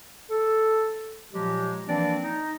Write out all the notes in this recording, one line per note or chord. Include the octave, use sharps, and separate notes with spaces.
A4
A#2 F3 F#3 G#3 G4
E3 F3 A#3 C4 D4 D5
D#4